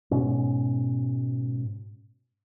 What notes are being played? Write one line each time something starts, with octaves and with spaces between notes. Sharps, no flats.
G#2 B2 C#4